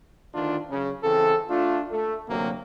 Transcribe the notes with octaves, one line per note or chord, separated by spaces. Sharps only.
D2 D#3 D4 F4
F#2 C#3
C#3 E3 C4 A4
A3 D4 F4
A3
A1 D2 C3 F#3 A#3